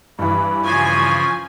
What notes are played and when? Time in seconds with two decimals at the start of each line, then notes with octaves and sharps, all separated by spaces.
0.19 G2 E3 B5
0.64 C#3 F3 G#5 C#6